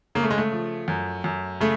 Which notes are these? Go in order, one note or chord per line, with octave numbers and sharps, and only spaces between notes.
C#3 A#3
A3
G#3
A3
F3
F#2
F#2
C#3 A3